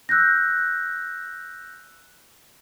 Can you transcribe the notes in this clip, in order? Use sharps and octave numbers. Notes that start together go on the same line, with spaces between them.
E6 F#6 G6 A#6